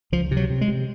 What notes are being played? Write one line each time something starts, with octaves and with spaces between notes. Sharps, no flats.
C#2 F3
C3
F#3
C3
G#3
C3